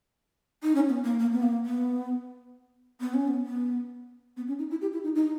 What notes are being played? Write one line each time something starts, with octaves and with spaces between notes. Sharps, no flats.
D#4
C#4
B3
A#3
A#3
B3
A#3
B3
B3
C#4
B3
B3
B3
C#4
D#4
E4
G4
E4
D#4
D#4